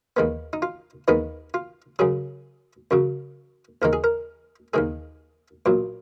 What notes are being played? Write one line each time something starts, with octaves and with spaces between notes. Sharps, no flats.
D#2 D#3 G#3 B3
D#4
F4
D#2 D#3 G#3 B3 D#4
F4
F#2 C#3 F#3 G#4
F#2 C#3 F#3
D#2 D#3 G#3 A#4
G#4
A#4
D#2 D#3 G#3 G#4
B1 A#2 F#3